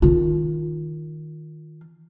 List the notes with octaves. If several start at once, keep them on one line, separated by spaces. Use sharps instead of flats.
D#3 F4